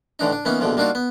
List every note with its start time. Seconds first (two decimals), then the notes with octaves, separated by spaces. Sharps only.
0.19 A2 D3 E3 D4 D#4
0.32 D4
0.45 E3 A#3 B3 C#4 D#4
0.60 A#1 B2 D3 E3 F3
0.77 G3 A#3 D4 D#4 F4 F#4
0.95 B3